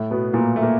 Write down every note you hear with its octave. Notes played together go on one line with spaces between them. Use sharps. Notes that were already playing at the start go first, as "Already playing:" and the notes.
Already playing: A2 A3
B2 B3
A#2 A#3
A3
A#3